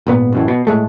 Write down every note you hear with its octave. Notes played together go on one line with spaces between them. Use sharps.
G#1 A#2 B3
A1 F#2 A2
B2
A2 G#3 A3